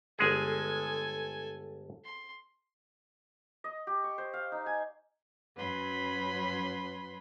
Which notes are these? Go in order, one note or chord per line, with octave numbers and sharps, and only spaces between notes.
G1 G#3 G#4 A4 G#5
C6
D#5
G4
C#6
C5
F5
D#4
G#5
F#2 F#3 C#4 B4 B5 C6